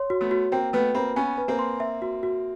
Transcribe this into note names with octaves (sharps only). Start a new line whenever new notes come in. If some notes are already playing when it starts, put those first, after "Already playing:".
Already playing: C#5 C6
F#4
A3 B3
F#4
A#3 C4 G5
A3 B3 B4
A#3 C4 B5
B3 C#4 G#5
B4
A#3 C4
C6
E5
F#4
F#4